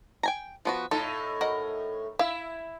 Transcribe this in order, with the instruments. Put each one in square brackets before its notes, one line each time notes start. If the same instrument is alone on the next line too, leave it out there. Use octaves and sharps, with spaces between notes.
[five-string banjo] G5 G#5 A#5
F3 B3 F#4
[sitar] A2 D#4 [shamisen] F4 [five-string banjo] A4
[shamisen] F#4 [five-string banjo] A#4 D#5
[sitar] E4 [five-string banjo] E5 [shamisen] F5